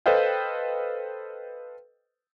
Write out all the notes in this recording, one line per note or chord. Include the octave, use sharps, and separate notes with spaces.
A4 B4 C5 D#5 F5 G5